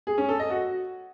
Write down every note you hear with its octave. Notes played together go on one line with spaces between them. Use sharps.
G#4
C#4
A4
D#5
F#4